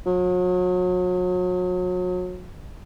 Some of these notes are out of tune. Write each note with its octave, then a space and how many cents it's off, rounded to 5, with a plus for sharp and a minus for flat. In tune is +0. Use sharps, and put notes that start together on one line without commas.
F#3 -35